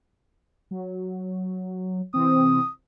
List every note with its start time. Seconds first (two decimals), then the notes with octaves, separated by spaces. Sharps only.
0.71 F#3
2.14 C3 E3 C4 D#6